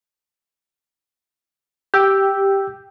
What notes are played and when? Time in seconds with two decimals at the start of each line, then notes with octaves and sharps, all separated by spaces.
1.94 G4 G5 E6 G6